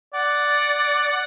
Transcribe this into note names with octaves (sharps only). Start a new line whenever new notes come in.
D5 F#5